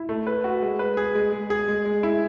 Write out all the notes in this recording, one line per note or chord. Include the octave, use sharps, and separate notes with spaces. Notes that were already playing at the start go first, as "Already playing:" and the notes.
Already playing: E4
A3
B4
F#4
G#3
B4
G#4
G#3
G#3
G#4
G#3
G#3
E4